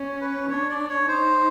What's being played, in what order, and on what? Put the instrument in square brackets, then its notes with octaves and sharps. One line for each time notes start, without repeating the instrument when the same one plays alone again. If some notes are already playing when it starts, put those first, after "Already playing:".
Already playing: [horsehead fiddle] C#4
[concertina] B4
[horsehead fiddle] D4 [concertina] C#5
[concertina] D5
C#5
[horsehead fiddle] D#4 [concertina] C5